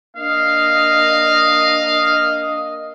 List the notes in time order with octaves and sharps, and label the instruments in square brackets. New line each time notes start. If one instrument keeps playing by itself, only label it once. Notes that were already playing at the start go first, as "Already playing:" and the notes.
[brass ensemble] A#3 D4 D#5 [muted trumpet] F5